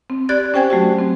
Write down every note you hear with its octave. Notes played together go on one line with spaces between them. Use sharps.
C4
G4 D5 F#6 G#6 A6
C#4 G4 C5 G5 G#5 G#6
F#3 A3 F#4 G4
C4